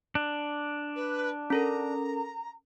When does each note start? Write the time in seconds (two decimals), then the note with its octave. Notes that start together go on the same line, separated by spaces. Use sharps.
0.15 D4
0.95 B4
1.50 C#4 A4 A#4 A#5